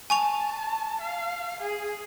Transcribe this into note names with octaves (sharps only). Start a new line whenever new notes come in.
G#5 A5 C#6 F7
F5
G#4